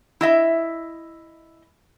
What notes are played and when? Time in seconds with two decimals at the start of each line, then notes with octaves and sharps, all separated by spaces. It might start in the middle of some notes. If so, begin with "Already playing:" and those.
0.21 E4 D#5 E5